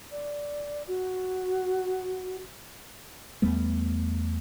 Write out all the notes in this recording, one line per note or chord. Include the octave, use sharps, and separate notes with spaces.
D5
F#4
E2 G3 A3 B3